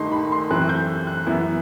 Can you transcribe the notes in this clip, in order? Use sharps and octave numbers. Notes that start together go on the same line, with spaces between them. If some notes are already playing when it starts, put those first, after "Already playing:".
Already playing: G2 D#3 A3 D#4 C6
B5
C6
F#2 E3 A3 C4 F#6
G6
F#6
F#2 E3 B3 E4